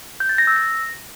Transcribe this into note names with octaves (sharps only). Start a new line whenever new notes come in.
G6
A6
A#6
E6
A#6